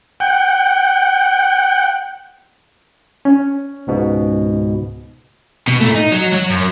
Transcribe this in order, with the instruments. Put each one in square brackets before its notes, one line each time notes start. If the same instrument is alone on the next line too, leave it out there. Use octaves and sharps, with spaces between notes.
[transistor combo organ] F#5 G5
[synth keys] C#4
[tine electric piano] C#2 G#2 B2
[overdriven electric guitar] B2
A#2 A3
D#4
F#3
F#3 C#5
F#2